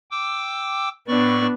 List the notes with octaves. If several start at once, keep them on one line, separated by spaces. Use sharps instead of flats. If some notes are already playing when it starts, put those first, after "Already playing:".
G5 D6 E6
A2 B3 D4 D5 C#6